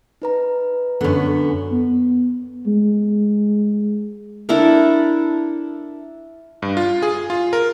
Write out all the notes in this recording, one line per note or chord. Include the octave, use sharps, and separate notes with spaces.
D#4 B4 A#5
F#2 D3 B3 C#4
B3
G#3
D4 E4 A4 A#4
G2
F4
G#4
F4
A#4